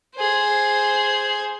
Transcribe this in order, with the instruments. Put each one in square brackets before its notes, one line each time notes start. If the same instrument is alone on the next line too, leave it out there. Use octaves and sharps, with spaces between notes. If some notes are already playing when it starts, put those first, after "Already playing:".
[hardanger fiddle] G#4 C5